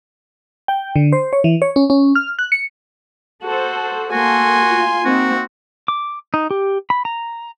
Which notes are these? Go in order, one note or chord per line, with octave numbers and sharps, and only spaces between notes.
G5
D3
C5
C#5
E3
C#5
C#4
C#4
F6
F#6
C#7
F#4 A4 C5
A#3 F#4 A4 G#5 C6
F4
A#3 C4 D#4 F#4
D6
D#4
G4
B5
A#5